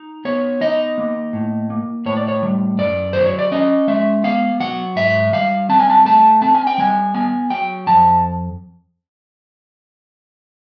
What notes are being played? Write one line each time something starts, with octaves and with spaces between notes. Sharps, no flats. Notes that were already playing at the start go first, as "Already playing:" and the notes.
Already playing: D#4
B3 C#5
D#4 D#5
A#3
A2
A#3
A2 C#5
D5
C#5
G3
F#2 D5
F#3 C5
C#5
D5
C#4 D#5
G#3 E5
B3 F5
F#3 F#5
G#2 E5
G3 F5
C4 A5
G#5
A5
A3 A5
C4 A5
G#5
G5
G3 G#5
B3 G#5
F#3 G5
F2 A5